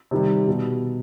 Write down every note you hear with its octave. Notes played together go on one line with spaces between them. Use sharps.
C3 D#3 G3
B2